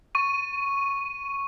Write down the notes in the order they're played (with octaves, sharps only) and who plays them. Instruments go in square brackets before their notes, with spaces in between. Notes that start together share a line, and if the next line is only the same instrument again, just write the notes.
[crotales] C#6 D#7